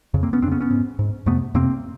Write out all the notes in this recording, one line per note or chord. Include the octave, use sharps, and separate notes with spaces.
F2 C#3
A#3 C4
B3 C#4
F2 C#3 B3 C4 C#4 D4
B3 C#4
G#2
G#2
F2 C3 A3 B3
F2 C3 A#3 C4